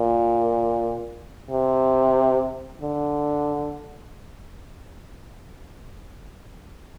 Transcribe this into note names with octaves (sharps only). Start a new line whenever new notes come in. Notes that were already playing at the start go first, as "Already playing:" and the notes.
Already playing: A#2
C3
D3